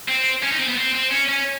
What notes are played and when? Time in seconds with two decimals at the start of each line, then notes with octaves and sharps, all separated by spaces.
0.08 C4
0.43 C#4
0.51 D#4
0.59 C4
0.68 B3
0.78 C4
0.94 C4
1.11 C#4
1.29 C#4